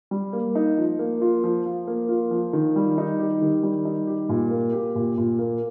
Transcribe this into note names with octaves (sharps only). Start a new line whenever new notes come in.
G3
A#3
D#4
F3
A#3
F4
F3
F3
A#3
F4
F3
D#3
G3
D#4
G4
D#3
G3
D#4
G4
A#2
A#3
G4
A#2
A#2
A#3